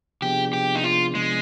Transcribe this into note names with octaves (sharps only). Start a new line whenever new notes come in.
C3 F3 B3 D4 G4 G#4
G4
D#4
F4
G#3